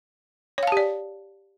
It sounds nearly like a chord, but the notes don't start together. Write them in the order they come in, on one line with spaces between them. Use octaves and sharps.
C#5 F5 A5 G4 D5